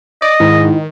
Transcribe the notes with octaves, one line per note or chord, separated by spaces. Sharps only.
D5 D#5
G#2 D#3 E4